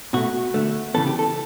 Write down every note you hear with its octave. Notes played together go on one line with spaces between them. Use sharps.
B2 A3 F#4
D3 A3
C#3 E3 B3 A4
G4
A4